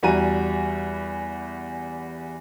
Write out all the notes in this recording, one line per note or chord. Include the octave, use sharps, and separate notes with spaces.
E2 G3 F#4 G#5 A#5 D#7